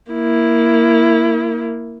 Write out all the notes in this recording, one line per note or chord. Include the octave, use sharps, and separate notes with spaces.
A#3 E4